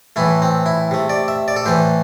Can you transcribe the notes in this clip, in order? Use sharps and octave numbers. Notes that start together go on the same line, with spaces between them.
A2 E3 A3 E4
C4
E4
C3 A3
D5
E5
D5
A4
A2 E3 A3 C5